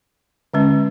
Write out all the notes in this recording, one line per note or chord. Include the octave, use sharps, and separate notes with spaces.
D3 G#3 C#4